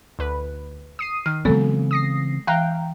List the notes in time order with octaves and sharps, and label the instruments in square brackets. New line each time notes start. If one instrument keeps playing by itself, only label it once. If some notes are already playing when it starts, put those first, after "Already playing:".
[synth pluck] D2 B4
D#6 C7 D#7
[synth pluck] D#3 [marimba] F6
[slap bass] C#3 E3 C4 [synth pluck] F#3 [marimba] G#3 B3 A4
[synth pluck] D#6 A#6 C7
[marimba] E3 F#6 [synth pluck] F5 G5 A#5